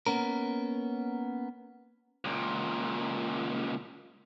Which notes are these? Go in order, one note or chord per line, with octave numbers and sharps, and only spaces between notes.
A#3 B3 C#4 A#4
C#2 A#2